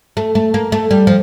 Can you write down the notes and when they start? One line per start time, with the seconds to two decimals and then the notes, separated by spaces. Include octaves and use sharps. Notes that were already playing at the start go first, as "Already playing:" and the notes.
0.17 A3
0.35 A3
0.54 A#3
0.72 A3
0.91 G3
1.07 F3